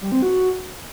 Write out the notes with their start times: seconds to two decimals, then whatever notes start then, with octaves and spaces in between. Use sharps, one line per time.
0.01 G3
0.12 C4
0.22 F#4